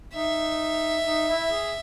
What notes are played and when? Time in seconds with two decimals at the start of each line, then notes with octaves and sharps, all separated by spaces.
0.14 D#4 E5
1.05 D#4
1.28 E4
1.50 G#4